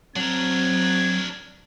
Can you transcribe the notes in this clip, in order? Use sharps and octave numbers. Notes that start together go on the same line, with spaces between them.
F#3 C4 D4 A#4 A#5 G#6